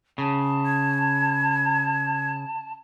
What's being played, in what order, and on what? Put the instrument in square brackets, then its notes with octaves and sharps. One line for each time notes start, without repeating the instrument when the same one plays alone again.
[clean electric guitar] C#3 [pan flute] A5
[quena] G#6